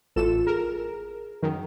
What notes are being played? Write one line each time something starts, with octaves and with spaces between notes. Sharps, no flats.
A1 F4 A4 E7
G#4 A#4
F#2 D#3